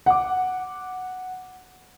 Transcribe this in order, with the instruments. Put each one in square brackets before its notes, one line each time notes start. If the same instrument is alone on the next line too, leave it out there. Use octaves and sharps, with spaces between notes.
[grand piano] F#5 D6